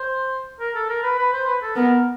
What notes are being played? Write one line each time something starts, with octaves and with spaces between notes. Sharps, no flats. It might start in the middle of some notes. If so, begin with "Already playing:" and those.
Already playing: C5
A#4
A4
A#4
B4
B4
C5
B4
A4
B3 A#4